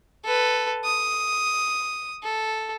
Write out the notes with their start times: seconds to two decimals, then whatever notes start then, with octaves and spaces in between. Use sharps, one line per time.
0.24 A4 B4
0.84 D#6
2.23 A4